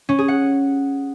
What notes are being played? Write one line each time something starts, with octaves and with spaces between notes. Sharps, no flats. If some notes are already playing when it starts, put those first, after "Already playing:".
C#4
G#4
F#5